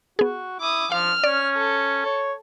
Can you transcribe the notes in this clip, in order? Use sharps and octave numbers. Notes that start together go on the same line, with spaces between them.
B3 F#4 G#4
E4 D6 D#6
F3 F5 F6
C#4 D5
A4
C#5